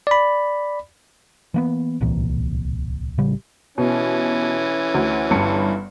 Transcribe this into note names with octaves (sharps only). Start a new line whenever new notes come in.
D5 B5
E3 A#3 B3
D1 C2 A#2 E3
A1 C#3 G3
B2 E3 C#4
D2
G1 G2 C#7